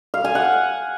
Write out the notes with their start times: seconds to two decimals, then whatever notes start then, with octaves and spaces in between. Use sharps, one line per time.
0.14 F5
0.24 G#5
0.35 F#5